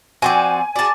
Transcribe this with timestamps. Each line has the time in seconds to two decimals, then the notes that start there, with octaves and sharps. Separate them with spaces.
0.22 F3 C4 F#4 D5 G#5
0.76 F#4 G#4 D5 A5